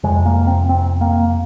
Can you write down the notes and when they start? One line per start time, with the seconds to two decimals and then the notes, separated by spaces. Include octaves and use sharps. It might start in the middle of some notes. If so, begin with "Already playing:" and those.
0.03 F2 C3 G#3
0.25 A#3
0.47 C4
0.69 C4
1.01 A#3